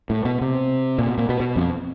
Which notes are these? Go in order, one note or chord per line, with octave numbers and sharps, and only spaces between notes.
A2
B2
C3
A#2
B2
A#2
B2
B2
F2